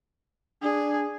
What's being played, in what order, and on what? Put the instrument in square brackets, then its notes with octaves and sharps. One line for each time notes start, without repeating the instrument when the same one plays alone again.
[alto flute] D4 [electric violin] G#4